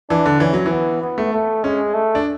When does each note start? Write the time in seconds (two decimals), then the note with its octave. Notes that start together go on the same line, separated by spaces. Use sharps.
0.10 E3 D4
0.26 D3
0.40 E3 C#4
0.53 F#3
0.66 E3
0.71 B3
1.02 B3
1.18 A3
1.33 A3
1.63 G#3 C#4
1.94 A3
2.15 D4